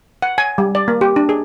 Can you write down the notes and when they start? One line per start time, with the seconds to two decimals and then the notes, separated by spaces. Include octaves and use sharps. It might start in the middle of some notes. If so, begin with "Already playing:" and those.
0.22 F#5
0.38 G#5
0.58 G3
0.75 D5
0.88 A#3
1.01 G4
1.16 D4
1.29 G#4